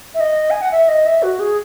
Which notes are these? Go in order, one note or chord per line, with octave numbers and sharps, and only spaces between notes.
E5
D#5
G#5
F#5
E5
D#5
E5
F#4
G#4